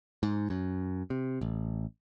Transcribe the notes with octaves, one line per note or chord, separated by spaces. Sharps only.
G#2
F#2
C3
A1